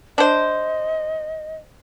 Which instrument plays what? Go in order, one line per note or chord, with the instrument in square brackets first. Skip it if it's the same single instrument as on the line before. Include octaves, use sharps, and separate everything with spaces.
[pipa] D4 C5 [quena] D#5